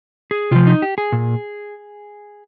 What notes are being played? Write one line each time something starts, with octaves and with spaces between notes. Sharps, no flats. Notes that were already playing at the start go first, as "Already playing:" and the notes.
G#4
C3 F3 F4
D#4
G4
G#4
A#2